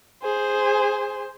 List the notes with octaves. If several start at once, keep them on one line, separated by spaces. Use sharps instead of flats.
G#4 C5